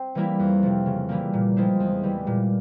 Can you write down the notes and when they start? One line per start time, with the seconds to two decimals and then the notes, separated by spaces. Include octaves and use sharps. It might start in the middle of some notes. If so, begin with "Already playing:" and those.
Already playing: C4
0.15 E3 G3 A#3 E4
0.39 F2
0.63 C3 F3
0.86 C#3
1.09 E3 G3 A#3
1.33 A#2
1.56 F3 G#3 C4 E4
1.80 E2
2.03 E3 G3
2.27 A#2